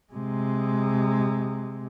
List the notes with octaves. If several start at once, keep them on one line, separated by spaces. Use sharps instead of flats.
C3 G#3